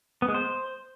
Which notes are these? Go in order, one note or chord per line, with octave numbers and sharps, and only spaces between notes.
B3
G#3
C5